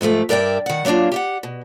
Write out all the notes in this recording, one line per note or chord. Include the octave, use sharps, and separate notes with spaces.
G#2 C3 F3 A3
G2 A#4 D5 E5 G5
D#3 F#5
F#3 A#3 C#4 D4 F4
G4 F5 F#5
B2